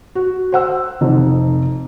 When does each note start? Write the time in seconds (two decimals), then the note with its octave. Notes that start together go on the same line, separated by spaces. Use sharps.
0.15 F#4
0.52 C5 F#5 E6
1.01 F1 F2 D#4